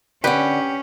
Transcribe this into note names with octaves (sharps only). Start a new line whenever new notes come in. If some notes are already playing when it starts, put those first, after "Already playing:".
D3 C#4 G4 B4 F#5